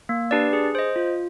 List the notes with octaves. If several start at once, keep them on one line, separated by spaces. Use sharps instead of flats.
A#3
D4 G4 B4 D5
G#4
C5 D#5
F4